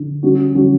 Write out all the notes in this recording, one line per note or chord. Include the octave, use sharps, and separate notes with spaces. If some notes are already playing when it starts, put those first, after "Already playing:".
Already playing: D3
D3 G3 C#4 F#4
D3 G3 C#4 F#4